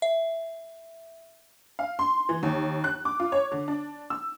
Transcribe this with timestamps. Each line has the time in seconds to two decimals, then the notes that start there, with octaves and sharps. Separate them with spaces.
0.02 E5
1.79 F5
1.99 C6
2.29 E3
2.43 D#2
2.84 F#6
3.05 D6
3.20 F4
3.32 C#5
3.52 D3
3.68 D4
4.10 E6